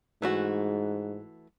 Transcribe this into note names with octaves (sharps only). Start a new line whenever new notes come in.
G#2 E3 A3 F#4